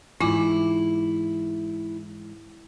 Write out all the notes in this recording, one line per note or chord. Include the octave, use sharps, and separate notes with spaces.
G#2 E3 E4 F4 G#5 D6